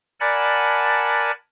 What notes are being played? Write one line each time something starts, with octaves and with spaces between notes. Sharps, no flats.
A#4 D5 F#5 G#5 A5 B5